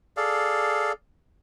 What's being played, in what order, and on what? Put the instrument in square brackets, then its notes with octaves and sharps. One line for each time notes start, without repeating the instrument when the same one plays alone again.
[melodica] G#4 A4 D5 F5